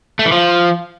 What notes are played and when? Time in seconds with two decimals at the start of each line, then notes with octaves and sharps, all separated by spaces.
0.19 A3
0.26 E3
0.32 F3